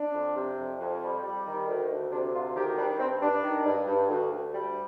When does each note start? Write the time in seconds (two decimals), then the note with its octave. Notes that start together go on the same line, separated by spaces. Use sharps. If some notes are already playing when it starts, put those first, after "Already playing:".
Already playing: D4
0.14 F2
0.36 C3
0.58 F2
0.80 F2
1.02 G3
1.23 G3
1.46 D#3
1.67 D2
1.90 D2
2.11 C3 D4
2.33 D2 F4
2.55 D#3 G4
2.77 G3 D4
2.99 G2 C4
3.22 G2 D4
3.43 D#3
3.66 G2
3.87 G2
4.09 D2
4.31 D2
4.54 G3